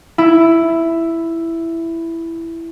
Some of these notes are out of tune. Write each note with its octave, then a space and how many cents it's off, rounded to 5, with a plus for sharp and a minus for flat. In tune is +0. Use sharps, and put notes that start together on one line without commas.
E4 +5